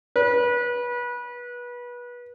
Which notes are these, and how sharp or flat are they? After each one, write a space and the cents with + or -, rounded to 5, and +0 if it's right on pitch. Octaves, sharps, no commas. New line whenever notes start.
B4 -25